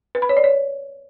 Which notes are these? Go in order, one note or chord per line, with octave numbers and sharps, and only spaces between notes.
B4
B5
C#5
D5
C#5